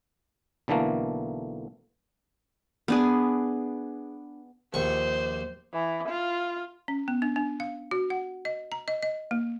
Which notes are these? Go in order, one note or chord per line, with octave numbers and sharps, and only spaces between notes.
B1 D3 E3 A3 A#3
B3 D4 G#4
A#1 D#2 C5 C#6
E3
F4
C#4
B3
D4
D4
F5
F#4
F#5
D#5
A#5
D#5
D#5
A#3